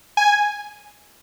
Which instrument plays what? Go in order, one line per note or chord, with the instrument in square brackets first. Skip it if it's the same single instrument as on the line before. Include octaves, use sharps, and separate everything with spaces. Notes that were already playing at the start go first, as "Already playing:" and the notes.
[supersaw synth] G#5